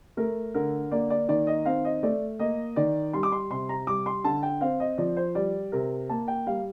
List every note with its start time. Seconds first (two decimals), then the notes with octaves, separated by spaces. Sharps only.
0.17 A3 A#4
0.54 D3 A#4
0.91 A#3 D5
1.10 D5
1.28 D#3 D5
1.47 D#5
1.65 C4 F5
1.85 D#5
2.03 A3 D5
2.39 A#3 D#5
2.76 D#3 D5
3.13 G3 C6
3.23 D6
3.32 C6
3.51 C3 C6
3.69 A#5
3.87 G3 D6
4.06 C6
4.24 D3 A5
4.43 G5
4.61 C4 F5
4.80 D#5
4.98 F3 D5
5.17 C5
5.35 G3 D5
5.72 C3 A#4
6.09 A#3 A5
6.28 G5
6.47 G3 F5